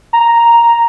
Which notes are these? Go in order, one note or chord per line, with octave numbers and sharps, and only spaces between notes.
A#5